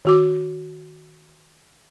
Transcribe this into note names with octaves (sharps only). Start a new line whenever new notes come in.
D#3 F#4 D6